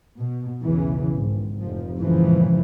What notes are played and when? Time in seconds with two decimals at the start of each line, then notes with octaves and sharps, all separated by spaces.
0.18 B2
0.62 B1 E2 C#3 E3
1.16 G#1
1.61 F1 F3
1.98 G#1 F#2 A#2 C#3 E3 F3